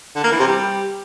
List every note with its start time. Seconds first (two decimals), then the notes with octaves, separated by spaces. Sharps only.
0.16 D3
0.24 A#3
0.32 E3
0.39 C3
0.47 G3